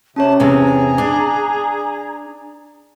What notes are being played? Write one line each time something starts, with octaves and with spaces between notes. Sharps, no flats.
C3 C#4 G4 C#5 A5
E2 C3 G#4 A#5
D4 D6